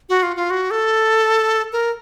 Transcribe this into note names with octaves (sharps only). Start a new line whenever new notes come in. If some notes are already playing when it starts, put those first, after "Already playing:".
F#4
F4
F4
F#4
A4
A#4